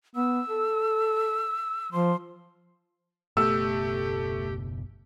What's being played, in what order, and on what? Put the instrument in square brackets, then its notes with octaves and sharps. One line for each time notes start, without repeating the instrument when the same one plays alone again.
[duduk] B3 [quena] E6
[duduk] A4
[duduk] F3 [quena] C6
[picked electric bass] F#1 B2 B3 [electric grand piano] A3 [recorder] G4 [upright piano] E6